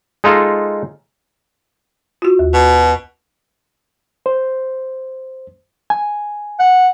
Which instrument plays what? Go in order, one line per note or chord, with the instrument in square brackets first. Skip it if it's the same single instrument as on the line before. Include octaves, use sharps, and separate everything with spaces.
[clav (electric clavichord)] G#3 D#4 F4 A4
[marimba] F4 F#4
D#2
[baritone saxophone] B2
[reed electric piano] C5
G#5
[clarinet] F#5